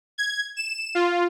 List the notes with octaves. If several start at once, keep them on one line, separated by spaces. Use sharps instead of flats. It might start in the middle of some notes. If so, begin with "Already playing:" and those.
G#6
E7
F4